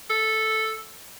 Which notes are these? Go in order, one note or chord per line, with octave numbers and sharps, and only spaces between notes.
A4